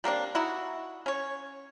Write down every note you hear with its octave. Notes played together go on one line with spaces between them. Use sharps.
G3 A#3 C4 D4
D#4 E4 F#4
C#4 C#5